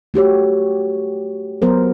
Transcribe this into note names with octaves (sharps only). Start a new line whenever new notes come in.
A3 F#4 G4 C#5
F#3 B3 A#4 C5